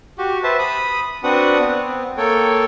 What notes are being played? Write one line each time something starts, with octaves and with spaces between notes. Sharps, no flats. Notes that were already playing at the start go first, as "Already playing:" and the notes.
F#4 G4
B4 C5 E5 A5
B5 D#6
C4 D4 F#4 B4 F#5 D#6
B3 C4
A#3 A4 C#5 G5